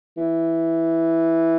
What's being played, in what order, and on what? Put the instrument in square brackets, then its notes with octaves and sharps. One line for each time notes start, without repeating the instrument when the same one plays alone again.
[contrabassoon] E3